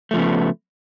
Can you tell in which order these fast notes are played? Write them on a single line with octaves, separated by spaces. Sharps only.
A3 F3 C#3 B3